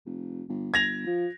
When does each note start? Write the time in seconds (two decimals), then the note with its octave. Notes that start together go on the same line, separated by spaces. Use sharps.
0.06 F1
0.49 G1
0.74 G1 G#6 A#6 F7
1.06 F3